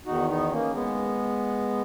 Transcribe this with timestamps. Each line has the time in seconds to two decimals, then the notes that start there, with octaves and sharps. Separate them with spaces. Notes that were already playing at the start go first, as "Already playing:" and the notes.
0.06 E2 D#3 D#4 F#4
0.28 B3 D#4
0.51 A#3 C#4
0.74 G#3 B3